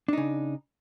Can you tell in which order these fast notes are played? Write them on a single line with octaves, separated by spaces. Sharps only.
D4 D#4 C#3